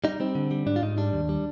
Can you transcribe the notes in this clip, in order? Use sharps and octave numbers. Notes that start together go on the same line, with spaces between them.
G3 D#4
G3 C4
D3
G3
G#2 D4
F4
G#2 D#4
G3 D4
D#2
G3